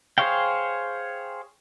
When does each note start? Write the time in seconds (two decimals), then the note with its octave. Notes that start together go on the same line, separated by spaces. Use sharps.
0.18 G#4 C5 C#5 F5 G5